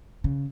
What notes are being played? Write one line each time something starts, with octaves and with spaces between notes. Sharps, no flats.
C#3